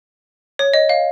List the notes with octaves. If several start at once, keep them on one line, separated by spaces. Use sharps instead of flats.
C#5
D#5
F5